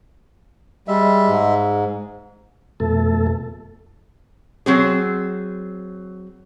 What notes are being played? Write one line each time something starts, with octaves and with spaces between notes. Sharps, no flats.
G3 G#3 E5
G#2
F2 B2 A3 A4
F#3 C4 G#4